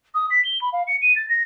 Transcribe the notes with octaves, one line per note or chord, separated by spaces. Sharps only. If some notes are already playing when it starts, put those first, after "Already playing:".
D#6
B6
G7
B5
F5
C#7
D#7
A6
A#6